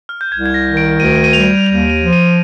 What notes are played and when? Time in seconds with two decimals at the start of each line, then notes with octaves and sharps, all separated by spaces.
0.09 F6
0.21 G6
0.31 C2 G#6
0.46 G#6
0.54 A#6
0.66 D#3
0.77 D7
0.99 D2 D#7
1.15 D7
1.24 D#7
1.33 G3 F7
1.66 D#2 F7
1.90 D#7
2.01 F3
2.13 D#7